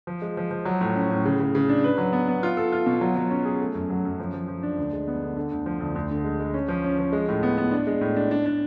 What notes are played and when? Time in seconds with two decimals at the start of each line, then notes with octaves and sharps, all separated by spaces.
0.07 F3
0.22 G#3
0.37 F3
0.51 F3
0.65 F#3
0.81 A2
0.96 C#4
1.11 A2
1.25 C#3
1.40 C#3
1.55 C#3
1.69 D4
1.84 B4
1.98 F#3
2.13 B3
2.28 B3
2.43 F4
2.57 A4
2.73 F4
2.86 B2
3.01 F#3
3.16 F#3
3.31 C#4
3.45 G#4
3.61 A3
3.75 F#2
3.90 F#3
4.05 F#2
4.20 F3
4.34 F3
4.48 F3
4.63 D4
4.77 D2
4.93 G#3
5.08 B3
5.21 D3
5.36 D3
5.51 D2
5.66 F3
5.80 D2
5.95 D2
6.11 D3
6.24 G#3
6.40 G#3
6.54 C#4
6.68 F3
6.84 C#4
6.99 F3
7.13 G#3
7.28 A2
7.43 B3
7.58 B3
7.71 D4
7.87 G#3
8.01 A2
8.16 D4
8.31 D4
8.46 D4